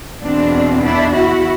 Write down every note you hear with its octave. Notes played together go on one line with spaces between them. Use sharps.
E2 B2 C4 D4
D4 E4
E4 F#4